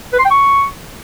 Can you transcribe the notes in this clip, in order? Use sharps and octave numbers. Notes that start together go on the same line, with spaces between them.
B4
C6
G5
C#6